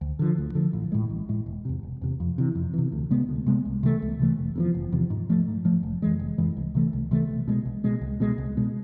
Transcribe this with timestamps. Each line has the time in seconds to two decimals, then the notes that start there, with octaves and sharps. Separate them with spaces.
0.01 D2
0.19 D3 F3
0.38 D2
0.55 D3 F3
0.73 A1
0.92 A2 G#3
1.10 A1
1.29 A2 G#3
1.46 E1
1.65 E2 C3
1.83 E1
2.02 E2 C3
2.20 F2
2.38 C3 E3
2.55 F2
2.74 C3 E3
2.92 D2
3.11 C3 G#3 B3
3.29 D2
3.46 C3 G#3 B3
3.65 C2
3.83 C3 E3 A3
4.02 C2
4.19 C3 E3 A3
4.39 F1
4.56 E2 C3 F3
4.75 F1
4.92 E2 C3 F3
5.10 G#2
5.30 F3 A3
5.48 G#2
5.65 F3 A3
5.83 F1
6.02 F2 E3 G#3
6.19 F1
6.38 F2 E3 G#3
6.57 C2
6.75 C3 E3 A3
6.93 C2
7.11 C3 E3 A3
7.29 B1
7.48 B2 G#3
7.65 B1
7.84 B2 G#3
8.01 C2
8.20 B2 G#3
8.38 C2
8.57 B2 G#3